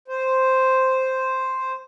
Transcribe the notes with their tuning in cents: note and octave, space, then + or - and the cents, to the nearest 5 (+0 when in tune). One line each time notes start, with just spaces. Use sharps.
C5 +0